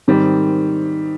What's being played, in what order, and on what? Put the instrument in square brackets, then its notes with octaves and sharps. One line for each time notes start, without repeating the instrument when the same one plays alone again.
[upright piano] G#2 D#3 G3 C4